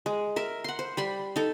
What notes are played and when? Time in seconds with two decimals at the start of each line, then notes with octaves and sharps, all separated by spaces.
0.06 G#3
0.36 A#4 E5
0.64 F#5 C6
0.79 C5
0.97 G3 B5 C6
1.36 D#4 A4